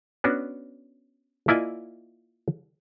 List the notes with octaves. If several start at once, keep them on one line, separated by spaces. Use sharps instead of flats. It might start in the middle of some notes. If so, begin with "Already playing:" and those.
B3 C#4 D4 F#4
A#3 E4 F4 D5 D#5 G#5